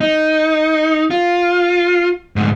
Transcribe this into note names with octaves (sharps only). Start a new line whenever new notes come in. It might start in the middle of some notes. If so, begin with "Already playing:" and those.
D#4
F4
D2 G#2